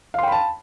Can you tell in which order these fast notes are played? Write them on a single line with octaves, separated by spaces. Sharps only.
F5 C6 G5 B5 A5